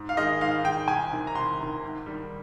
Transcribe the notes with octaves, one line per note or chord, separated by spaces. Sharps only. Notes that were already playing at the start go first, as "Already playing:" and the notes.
Already playing: G#2
F5
D#3 G#3 D#5
G#2 F5
D#3 G#3 G5
C2 G#5
C3 D#3
A#5
C2 C6
C3 D#3
G#2
D#3 G3